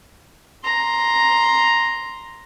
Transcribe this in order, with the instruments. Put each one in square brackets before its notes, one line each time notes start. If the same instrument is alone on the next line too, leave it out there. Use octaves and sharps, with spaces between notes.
[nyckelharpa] A#5 C6